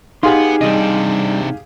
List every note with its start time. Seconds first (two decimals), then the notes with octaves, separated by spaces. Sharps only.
0.23 B3 D#4 G4 G#4 F5 F#5 C6
0.61 C3 G3 D4 D#5